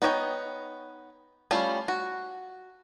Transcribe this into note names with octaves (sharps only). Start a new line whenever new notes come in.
B3 D#4 C#5 D#5 G5
G3 A3 C#4 E4 F4
F#4